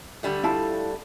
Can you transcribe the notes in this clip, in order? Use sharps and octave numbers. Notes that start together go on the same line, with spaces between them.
D3 G3 A3
E4 F4 A5